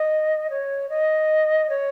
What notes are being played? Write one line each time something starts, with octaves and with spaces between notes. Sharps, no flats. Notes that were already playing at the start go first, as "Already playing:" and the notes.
Already playing: D#5
C#5
D#5
C#5